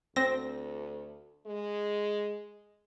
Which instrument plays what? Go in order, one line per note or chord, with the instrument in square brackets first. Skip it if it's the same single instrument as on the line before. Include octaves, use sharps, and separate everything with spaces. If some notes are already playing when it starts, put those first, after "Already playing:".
[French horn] D2 [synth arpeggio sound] C4 A#6
[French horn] G#3